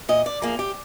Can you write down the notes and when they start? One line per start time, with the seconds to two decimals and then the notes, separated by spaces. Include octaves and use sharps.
0.09 A#2 D#5
0.26 D5
0.42 F3 A#3 G#4
0.59 G4